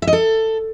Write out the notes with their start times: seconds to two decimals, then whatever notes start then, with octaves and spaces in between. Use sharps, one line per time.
0.02 E5
0.07 D#5
0.13 A4